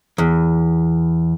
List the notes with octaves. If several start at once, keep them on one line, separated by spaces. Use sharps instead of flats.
E2